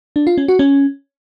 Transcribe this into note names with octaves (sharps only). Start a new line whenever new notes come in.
D4
F4
C#4
F#4
C#4